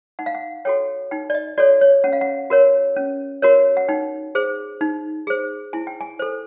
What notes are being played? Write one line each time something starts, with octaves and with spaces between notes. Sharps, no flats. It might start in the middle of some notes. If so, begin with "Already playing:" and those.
D#4 F#5
F5
F#5
F#4 A4 C#5 G5
D#4 G5
D5
D#5
F#4 A4 C#5 D5
C#5
C#4 F#5
F5
F#5
F#4 A#4 C#5
C#4
F#4 A#4 C#5
F#5
D#4 G5
G#4 C5
D#4
G#4 C5
E4 G#5
G5
G#5
A4 C5